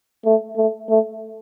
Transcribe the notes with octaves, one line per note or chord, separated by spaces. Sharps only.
A3
A3
A3